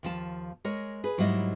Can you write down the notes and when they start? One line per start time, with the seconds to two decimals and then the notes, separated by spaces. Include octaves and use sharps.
0.03 D#2 F3 A5
0.64 G#3 A#4 C#5
1.04 G#4 B4
1.18 G#2 F#3 G3 A#3 E4 D#5